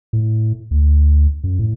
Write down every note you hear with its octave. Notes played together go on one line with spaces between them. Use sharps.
A2
D2
F#2
A2